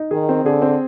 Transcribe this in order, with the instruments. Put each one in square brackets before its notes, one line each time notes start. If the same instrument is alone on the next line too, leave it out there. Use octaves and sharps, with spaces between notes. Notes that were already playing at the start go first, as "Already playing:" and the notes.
Already playing: [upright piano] D#4
[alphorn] D#3 [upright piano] G#4
[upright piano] C4
[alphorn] D3 [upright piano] G#4
[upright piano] C4